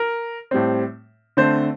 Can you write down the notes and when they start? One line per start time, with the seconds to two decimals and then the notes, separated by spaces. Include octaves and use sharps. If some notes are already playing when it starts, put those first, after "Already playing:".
Already playing: A#4
0.51 A2 G3 C4
1.37 D3 A3 C4 C5